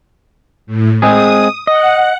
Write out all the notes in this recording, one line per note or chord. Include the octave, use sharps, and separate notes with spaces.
A2
G#3 C4 G#4 D#6
D#5 F#5